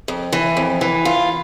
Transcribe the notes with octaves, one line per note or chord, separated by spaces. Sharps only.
F2
E3
F2
E3
F4